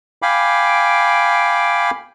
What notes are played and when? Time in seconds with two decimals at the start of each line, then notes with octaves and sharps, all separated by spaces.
0.22 F5 G5 G#5 B5 D6